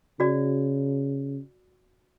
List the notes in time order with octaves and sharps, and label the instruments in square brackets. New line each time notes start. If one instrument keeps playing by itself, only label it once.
[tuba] C#3 [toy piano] F#4 D5